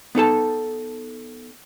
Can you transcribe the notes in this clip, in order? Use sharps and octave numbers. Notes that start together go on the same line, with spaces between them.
B3 D#4 A4 A5